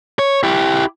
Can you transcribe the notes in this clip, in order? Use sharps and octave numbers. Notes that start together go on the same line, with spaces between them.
C#5
E4 G4